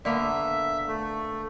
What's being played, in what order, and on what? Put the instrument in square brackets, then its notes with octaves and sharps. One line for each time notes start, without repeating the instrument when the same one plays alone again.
[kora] D3 A#3 B3 [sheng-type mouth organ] E5
[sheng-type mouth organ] A3